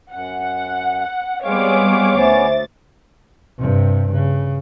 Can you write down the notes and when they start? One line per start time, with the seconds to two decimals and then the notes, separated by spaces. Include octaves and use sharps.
0.13 F#2 F#5
1.44 G3 G#3 B3 C4 G#4 C#5 F5 D6
2.16 D2 B3 C#4 C5 E5 A6
3.58 G2 C3
4.12 C#3